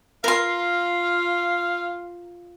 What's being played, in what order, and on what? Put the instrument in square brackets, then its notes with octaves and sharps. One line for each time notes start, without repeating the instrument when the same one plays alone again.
[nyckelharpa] F4 [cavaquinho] A#4 C6 [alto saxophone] F5